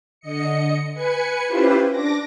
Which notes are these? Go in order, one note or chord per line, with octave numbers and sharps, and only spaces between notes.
D3 D#5 C#7
B4 G#5 C#7
C#4 E4 F4 G4 B4 C5
D4 D6 A#6